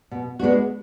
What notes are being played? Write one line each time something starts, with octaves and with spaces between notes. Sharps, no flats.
B2
G#3 B3 D4 F#4